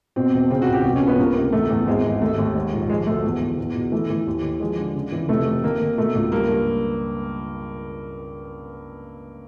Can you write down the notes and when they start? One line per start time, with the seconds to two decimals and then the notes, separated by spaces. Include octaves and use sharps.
0.16 B2 C4
0.33 E1
0.50 C#3 C4
0.62 F#4
0.68 C#2 G4
0.84 F1 F#4
0.96 C#4
1.02 F2
1.07 B3
1.19 C#2 A#3
1.36 C3
1.52 E2 A3
1.71 E2
1.87 G#1 G#3
2.05 G#1
2.22 D#2 A3
2.38 D#2
2.55 G#2
2.72 A#1
2.89 F3 G#3
3.06 D2 A3
3.24 E2
3.41 E2
3.58 E2
3.75 B2
3.92 E3 A3
4.10 E3
4.27 D#2
4.44 D#3
4.60 F3 G#3
4.77 D3
4.95 C#3
5.12 E3
5.29 F1 A3
5.46 D#3
5.64 D#3 A#3
5.81 D#3
5.97 B2 A3
6.15 C#2
6.32 G2 A#3
6.49 G2